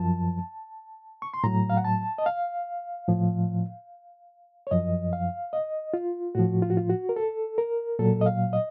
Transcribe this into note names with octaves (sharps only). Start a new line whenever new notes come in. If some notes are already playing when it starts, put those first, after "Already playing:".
Already playing: F#2 F3 A5
C#6
C6
A2 F#3 A#5
F5
F#5
A5
D#5
F5
A2 F3
C#5
F#2 F3 D#5
F5
D#5
F4
A2 F3 F#4
F4
F#4
F4
F#4
A#4
A4
A#4
A#2 F#3 A4
D#5
F5
D#5